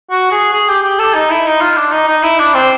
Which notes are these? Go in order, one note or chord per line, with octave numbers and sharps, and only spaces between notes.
F#4
G#4
G#4
G4
G4
A4
D#4
E4
D#4
F4
D4
D#4
D#4
E4
D4
C4